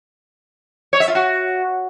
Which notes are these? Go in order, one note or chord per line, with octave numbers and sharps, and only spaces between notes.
C#5
E5
F4
F#4